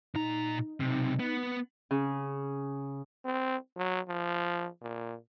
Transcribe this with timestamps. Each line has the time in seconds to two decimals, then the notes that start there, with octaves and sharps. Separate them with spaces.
0.15 A#2 D#4 A#5
0.80 B1 C3
1.20 B3
1.91 C#3
3.25 C4
3.77 F#3
4.08 F3
4.82 A#2